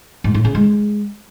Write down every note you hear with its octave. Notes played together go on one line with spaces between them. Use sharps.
G#2
A2
C#3
G#3